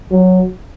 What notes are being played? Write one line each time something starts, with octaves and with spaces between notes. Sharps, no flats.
F#3